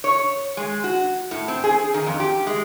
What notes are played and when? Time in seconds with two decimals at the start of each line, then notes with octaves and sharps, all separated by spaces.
0.04 C#5
0.57 G#3
0.84 F#4
1.31 A2
1.48 C4
1.64 G#4
1.94 D#3
2.06 F2
2.20 G4
2.47 G#3